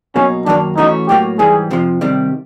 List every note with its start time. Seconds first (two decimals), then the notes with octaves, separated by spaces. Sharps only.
0.16 B2 F#3 A#3 C#4 D#4
0.46 F#2 D#3 F#3 A#3 D4
0.77 E3 A3 C#4 D#4 F#4
1.08 A2 F#3 A#3 G4
1.39 G#2 E3 G3 G#4
1.71 F2 C3 F3
2.01 C3 D#3 G3